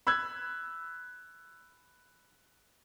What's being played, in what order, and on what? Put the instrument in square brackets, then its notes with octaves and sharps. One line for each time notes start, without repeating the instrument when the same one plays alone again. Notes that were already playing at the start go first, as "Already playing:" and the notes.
[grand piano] B5 E6 F#6 G#6